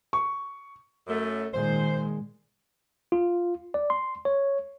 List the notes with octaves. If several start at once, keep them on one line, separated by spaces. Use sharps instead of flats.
C#6
F#2 A3
A#2 D#3 G#3 C5
F4
D5
C6
C#5